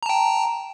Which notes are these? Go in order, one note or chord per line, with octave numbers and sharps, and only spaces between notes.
G5 A5 A#5